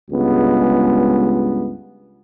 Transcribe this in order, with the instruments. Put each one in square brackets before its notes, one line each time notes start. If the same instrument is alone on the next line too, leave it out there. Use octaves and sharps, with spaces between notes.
[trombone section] C#2 G2 G#3 B3